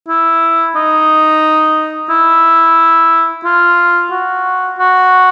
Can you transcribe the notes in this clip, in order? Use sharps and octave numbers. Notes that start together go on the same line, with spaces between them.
E4
D#4
E4
F4
F#4
F#4